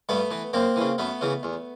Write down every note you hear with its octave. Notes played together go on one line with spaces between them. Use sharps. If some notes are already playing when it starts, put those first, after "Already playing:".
G2 A3 B3
E3
F#2 A#3 C4
C#3 E3
F#2 A3 B3
C#3 E3
E2